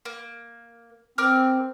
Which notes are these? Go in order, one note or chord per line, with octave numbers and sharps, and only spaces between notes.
A#3
C4 A#4 D6 F6